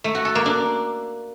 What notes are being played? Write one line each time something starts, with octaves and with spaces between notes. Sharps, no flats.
A3
F#4
A4
A#3
D4